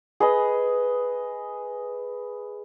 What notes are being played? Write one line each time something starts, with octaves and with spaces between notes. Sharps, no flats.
G#4 B4 D#5